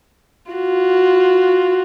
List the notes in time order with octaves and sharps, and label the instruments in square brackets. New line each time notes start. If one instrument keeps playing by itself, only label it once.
[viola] F4 F#4